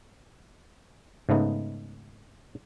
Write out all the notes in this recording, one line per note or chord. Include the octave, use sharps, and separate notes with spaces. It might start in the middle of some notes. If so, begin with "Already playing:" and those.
G#2 C#3 A3 B3 D#4